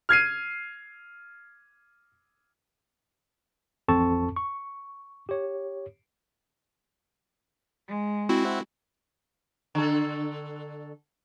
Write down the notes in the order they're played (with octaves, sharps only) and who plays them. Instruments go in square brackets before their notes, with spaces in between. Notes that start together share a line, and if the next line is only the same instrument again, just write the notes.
[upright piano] F6 G#6 C7 D#7
[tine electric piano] A1 F2 C4 A4 A5 C#6
C#6
G4 C#5
[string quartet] G#3
[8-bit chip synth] C4 E4 F#4
[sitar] D3 A4